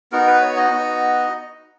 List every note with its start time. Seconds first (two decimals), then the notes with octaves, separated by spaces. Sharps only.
0.12 B3 D#4 F#4 A#4
0.27 B4
0.41 C#5
0.56 D#5
0.71 B3 D#4 F#4